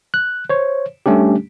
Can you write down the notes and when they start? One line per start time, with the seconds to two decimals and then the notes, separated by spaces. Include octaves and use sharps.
0.14 F#6
0.50 C5 C#5
1.06 G3 A3 C#4 D4 G4